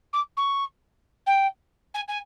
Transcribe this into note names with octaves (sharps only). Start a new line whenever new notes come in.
D6
C#6
G5
G#5
G#5